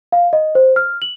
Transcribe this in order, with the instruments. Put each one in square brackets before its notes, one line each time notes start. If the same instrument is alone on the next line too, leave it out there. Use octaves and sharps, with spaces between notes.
[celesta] F5
D#5
C5
F6
F#7